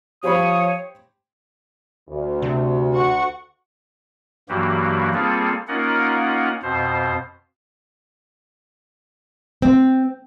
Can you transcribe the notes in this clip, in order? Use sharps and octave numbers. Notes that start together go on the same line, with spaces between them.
F3 G4 C5 C#5 B5 D#6
D2
C3
F#4 F#5 C#6
G2 E3 F#3 A#3 F#4 G4
G3 A#3 C4 F4 G#4 A4
A#3 C#4 D#4 F4 A#4 F#5
F2 B2 C5
C4